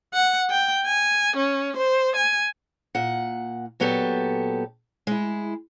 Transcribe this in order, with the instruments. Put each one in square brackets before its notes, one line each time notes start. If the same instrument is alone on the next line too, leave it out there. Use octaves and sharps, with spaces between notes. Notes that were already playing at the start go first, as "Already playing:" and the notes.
[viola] F#5
G5
G#5
C#4
C5
G#5
[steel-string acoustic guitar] A#2 F#5
A#2 F#3 B3 G4 A4
G#3 E4